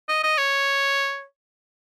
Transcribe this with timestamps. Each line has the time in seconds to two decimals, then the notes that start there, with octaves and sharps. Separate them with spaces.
0.09 D#5
0.23 D#5
0.37 C#5